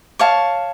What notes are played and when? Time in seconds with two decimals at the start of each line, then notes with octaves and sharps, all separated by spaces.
0.19 C#5 F5 A5 C#6